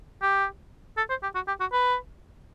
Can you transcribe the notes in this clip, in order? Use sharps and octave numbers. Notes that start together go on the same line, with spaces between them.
G4
A4
C5
G4
F#4
G4
F#4
B4